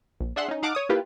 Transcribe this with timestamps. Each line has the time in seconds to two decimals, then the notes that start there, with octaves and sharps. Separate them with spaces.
0.20 A#1
0.36 D4 G#4 E5 F#5 C6 F#6
0.48 C#4 D#4
0.63 D#4 F5 F#5 A5 D6
0.75 C#5 D#6
0.89 A#3 E4 F4 G4 B4